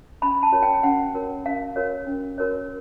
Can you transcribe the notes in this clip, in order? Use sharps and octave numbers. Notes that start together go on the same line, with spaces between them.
C#4 B5
A5
F#4 A#4 C#5
G5
C#4 F#5
F#4 A#4 C#5
C#4 F5
F#4 A#4 C#5
C#4
F#4 A#4 C#5